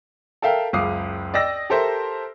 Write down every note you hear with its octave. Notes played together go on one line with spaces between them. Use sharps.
A4 A#4 E5 F5 G5
F#1 C#2 F5 D6 D#6 C7
D5 D#5 G5 E6 A#6
G4 A4 A#4 C5 E5